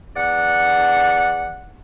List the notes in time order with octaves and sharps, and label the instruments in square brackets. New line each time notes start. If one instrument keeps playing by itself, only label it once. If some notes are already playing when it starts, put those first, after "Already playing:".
[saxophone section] E2 D5 F#5